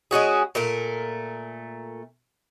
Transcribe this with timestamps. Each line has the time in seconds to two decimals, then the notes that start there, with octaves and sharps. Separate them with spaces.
0.11 G#3 C#4 F#4 G#4
0.55 A#2 A3 A#4